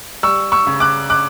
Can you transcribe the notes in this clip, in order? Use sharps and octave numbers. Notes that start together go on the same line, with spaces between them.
G3 C#6 E6
C#6 E6
C#3
D6 F#6
D6 F#6